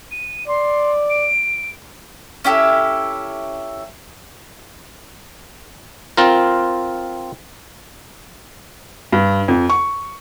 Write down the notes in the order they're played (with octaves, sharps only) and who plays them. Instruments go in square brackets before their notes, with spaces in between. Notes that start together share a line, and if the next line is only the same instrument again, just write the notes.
[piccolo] D#7
[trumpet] D5 [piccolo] C6
[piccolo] D7
[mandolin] C#4 E4 G4 A4
[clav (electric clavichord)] C4 F4 A#4
[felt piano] G2
F2
C#6